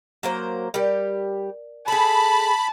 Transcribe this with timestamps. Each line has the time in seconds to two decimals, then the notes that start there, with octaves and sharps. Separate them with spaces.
0.23 F#3 A#3 C5
0.74 G3 G4 A#4 D5
1.88 G#4 A4 A5 B5